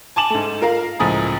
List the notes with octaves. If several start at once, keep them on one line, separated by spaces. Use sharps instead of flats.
G#5 A5 D6 E7 F#7
G#2 A3
F4 A#4 F5
C#2 A2 F3 G#5 A#5 D#6